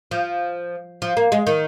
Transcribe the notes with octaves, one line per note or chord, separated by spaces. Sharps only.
F3
F3
A#3
G#3
D#3